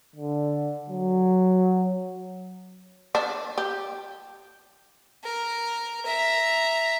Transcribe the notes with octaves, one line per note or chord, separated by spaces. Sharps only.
D3
F#3
D4
G4
A#4
E5 A#5